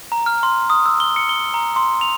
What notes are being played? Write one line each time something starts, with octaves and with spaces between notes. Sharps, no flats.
A#5
F6
C6
D#6
E6
G7
C#7
G7
A#5
C6
F7